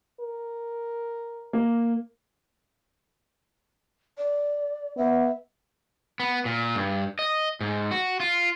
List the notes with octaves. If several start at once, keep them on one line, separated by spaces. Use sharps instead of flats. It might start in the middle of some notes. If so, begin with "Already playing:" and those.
A#4
A#3
D5
B3 E5
B3
A#2
G2
D#5
G#2
F#4
F4